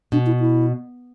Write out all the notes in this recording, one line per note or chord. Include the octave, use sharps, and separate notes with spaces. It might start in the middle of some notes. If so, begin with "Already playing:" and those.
B2 D4
E4
E4